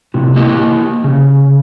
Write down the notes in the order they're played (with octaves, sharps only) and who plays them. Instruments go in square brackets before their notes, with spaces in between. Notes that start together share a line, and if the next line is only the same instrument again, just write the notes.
[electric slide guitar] A2 C3
A#3 E4 G4 D#5
C#3